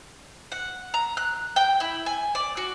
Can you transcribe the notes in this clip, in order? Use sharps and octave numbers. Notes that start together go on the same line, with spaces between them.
F#5
A#5
F#6
G5
E4
G#5
D5
F#4